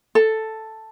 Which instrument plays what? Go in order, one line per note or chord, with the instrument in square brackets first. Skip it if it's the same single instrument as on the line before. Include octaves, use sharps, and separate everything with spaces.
[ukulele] A4